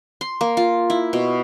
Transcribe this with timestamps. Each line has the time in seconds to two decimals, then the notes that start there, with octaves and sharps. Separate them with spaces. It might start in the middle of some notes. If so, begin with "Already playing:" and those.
0.21 C6
0.41 A#3
0.57 F4
0.90 E4
1.13 B2